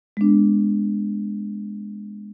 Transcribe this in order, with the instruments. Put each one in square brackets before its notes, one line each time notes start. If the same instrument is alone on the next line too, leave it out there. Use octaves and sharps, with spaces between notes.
[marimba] G#3 B3 D4